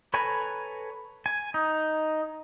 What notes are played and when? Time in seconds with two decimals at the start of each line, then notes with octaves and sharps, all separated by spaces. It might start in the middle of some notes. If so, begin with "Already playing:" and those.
0.14 A4 B4 C#5 G#5 A#5
1.26 G#5
1.54 D#4